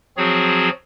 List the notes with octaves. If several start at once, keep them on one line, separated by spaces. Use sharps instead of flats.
F3 F#3 C4 F#4 G#4 C#5